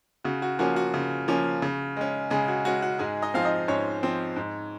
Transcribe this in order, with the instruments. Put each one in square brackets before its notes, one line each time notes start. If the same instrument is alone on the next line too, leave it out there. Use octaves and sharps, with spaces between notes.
[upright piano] C#3 F#4
F#4
F3 A#3 C#4 F#4
F#4
C#3
F3 A#3 C#4
C#3
G#3 C#4
C#3 G#3 G#4
F#4
G#3 C#4 F#4
F#4
G#2 G#3 G#4
D#4 D#5
F3 C4 F5
D#4 D#5
G#2 C#4 C#5
F3 C4
G#2